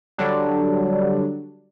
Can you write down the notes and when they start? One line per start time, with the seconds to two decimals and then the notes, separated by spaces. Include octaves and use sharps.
0.18 D3 F#3 G3 D4